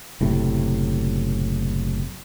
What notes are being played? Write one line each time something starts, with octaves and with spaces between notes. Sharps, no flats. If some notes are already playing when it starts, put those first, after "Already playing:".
F#1 A2 C3